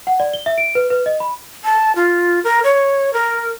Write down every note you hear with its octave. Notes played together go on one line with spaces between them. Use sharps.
F#5
D5
G7
E5
D7
B4
B4
D#5
B5
A5
F4
A#4
C#5
A#4